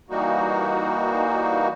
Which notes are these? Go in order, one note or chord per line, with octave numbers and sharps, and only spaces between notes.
E3 G3 A#3 D#4 F#4